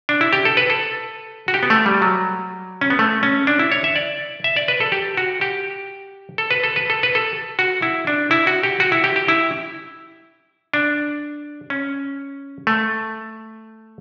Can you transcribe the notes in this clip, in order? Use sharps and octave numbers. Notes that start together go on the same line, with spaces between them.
D4
E4
G4
A4
B4
A4
F#4
G4
B3
A3
G3
F#3
C#4
B3
A3
C#4
D4
E4
C#5
E5
D5
E5
D5
B4
A4
G4
F#4
G4
A4
B4
A4
B4
A4
B4
A4
F#4
E4
D4
E4
F#4
G4
F#4
E4
G4
G4
E4
D4
C#4
A3